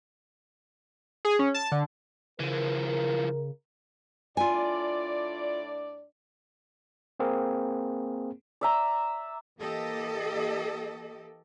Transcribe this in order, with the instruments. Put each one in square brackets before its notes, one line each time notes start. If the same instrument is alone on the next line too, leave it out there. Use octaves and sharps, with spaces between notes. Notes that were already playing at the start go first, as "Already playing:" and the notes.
[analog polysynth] G#4
C#4
A5
D3
[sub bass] C#3 [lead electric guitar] E3 F3 [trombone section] A#4
[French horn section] A2 D4 D5 [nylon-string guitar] F4 G#5
[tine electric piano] A#3 C4 G#4 A#4
[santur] D5 E5 A#5
[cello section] E3 A#3 G4 A4 D#5